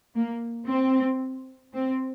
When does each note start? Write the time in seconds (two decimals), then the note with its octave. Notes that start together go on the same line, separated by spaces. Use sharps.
0.15 A#3
0.68 C4
1.73 C4